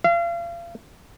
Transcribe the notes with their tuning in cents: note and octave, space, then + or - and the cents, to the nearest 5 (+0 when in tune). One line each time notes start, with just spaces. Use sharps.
F5 -35